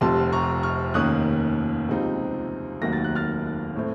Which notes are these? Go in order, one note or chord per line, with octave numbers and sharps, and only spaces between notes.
F1 F2 C3 A5 C6
A#5 C#6
C#6 F6
F1 D#2 D#3 A#3 C#4 D#6 F#6
C#2 C3 F3 C4 D#4
F1 D#2 D#3 F#3 A#3 A#6
A6
F#6
F6 A6
A2 A3 C4